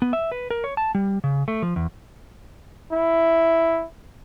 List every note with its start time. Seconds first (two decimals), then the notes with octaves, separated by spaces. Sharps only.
0.02 B3
0.13 E5
0.32 B4
0.51 A#4
0.64 C#5
0.77 A5
0.95 G3
1.24 C#3
1.48 A3
1.62 F3
1.76 E2
2.93 E4